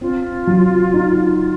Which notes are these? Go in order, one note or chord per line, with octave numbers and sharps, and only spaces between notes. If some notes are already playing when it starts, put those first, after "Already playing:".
C4 F4
F#3
D#4